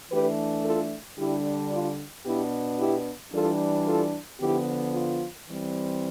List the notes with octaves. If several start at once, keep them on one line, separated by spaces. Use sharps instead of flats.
E3 A3 D4 G4 B4
F4 A4
D3 G3 D4 E4 G4
F4
B2 B3 D4 E4 G4
E4 G4
E3 G3 D4 F4 A4
F4 A4
D3 F3 B3 E4 G4
F4
E3 G3 C4